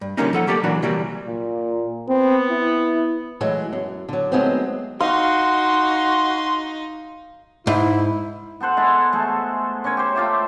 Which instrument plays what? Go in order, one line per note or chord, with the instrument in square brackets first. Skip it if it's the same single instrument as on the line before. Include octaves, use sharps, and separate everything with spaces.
[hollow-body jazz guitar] G2
D3 G3 A#3 C#4 D#4
F3 A4 F#5
F#3 A#3 G4 A4 D5
A#2 E3 F#3 A#3 D4 F#4
C3 E3 F#3 G3 A#3 G4
[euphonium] A#2
[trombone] B3 [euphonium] C4
[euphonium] E4
[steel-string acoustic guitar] E3 F#3 G#3 A3
F#2
D3 F#3
D#3 F#3 G#3 A3 B3 C4
[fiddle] D#4 [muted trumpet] F#4 [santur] F5 [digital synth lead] C6
[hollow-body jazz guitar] G#2 [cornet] E4
[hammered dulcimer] B3 A4 C5 F#5
G#3 E4 A4
G#3 A3 A4
C#4 A#4 C#5 G#5
G4 C5
A3 F4 G4 E5